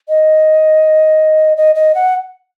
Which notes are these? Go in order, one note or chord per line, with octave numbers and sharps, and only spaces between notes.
D#5
D#5
D#5
F#5